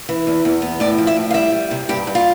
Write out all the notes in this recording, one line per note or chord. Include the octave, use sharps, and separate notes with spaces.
E3
E2
E2
B3
A2 D5
F3
E5
A2
F5
G3 E5
G3
C3
G2 G4
G2
F4